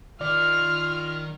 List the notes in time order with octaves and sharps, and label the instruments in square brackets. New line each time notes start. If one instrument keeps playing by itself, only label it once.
[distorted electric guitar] D#3 [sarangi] F4 [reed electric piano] D5 [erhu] F6